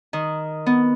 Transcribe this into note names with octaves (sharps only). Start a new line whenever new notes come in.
D#3
B3